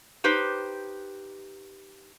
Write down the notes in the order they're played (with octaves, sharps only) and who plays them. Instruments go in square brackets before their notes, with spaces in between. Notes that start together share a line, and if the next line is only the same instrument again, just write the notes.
[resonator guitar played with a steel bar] D#4 G4 B4 C5